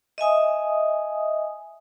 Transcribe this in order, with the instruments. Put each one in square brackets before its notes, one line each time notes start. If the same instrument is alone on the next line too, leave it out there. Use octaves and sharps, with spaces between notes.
[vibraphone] D#5 E5 G#5 D#6